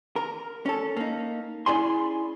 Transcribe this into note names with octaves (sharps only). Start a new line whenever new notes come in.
A#4
C#4 A4
A#3 D#4
C#4 E4 G#4 D5 G#5 C6